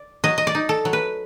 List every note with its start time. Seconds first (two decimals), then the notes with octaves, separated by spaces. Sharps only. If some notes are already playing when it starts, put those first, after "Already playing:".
Already playing: D5
0.24 F#3 D#5
0.38 D#5
0.47 D5
0.55 D#4
0.69 A4
0.85 F#3
0.93 B4